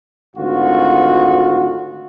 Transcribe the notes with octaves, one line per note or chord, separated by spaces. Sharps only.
G#1 D2 F4 F#4